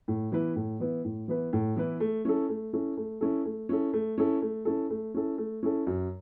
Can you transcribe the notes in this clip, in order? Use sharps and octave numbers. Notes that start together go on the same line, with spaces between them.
A2
E3 B3 E4 B4
A2
E3 B3 E4 B4
A2
E3 B3 E4 B4
A2
E3 B3 E4 B4
A3
C#4 E4 A4
A3
C#4 E4 A4
A3
C#4 E4 A4
A3
C#4 E4 A4
A3
C#4 E4 A4
A3
C#4 E4 A4
A3
C#4 E4 A4
A3
C#4 E4 A4
F#2